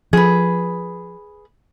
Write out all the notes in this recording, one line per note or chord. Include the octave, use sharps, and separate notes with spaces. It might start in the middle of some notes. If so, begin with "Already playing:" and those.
F3 G#4 B4